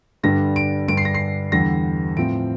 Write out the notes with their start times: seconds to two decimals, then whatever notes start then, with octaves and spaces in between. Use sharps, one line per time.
0.23 G2 D3 G3 D4 A#6
0.56 D7
0.88 G2 D3 G3 D4 D7
0.97 C7
1.05 A#6
1.14 C7
1.52 E2 D3 G3 A#6
2.17 A2 F3 C4 D7